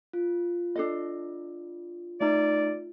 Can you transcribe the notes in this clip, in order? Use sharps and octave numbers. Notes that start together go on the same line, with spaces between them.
F4
D4 A4 D#5
A3 D#4 D5